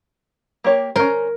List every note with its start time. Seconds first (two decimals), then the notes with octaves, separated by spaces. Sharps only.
0.64 A#3 G4 C#5
0.96 C#4 A#4 C5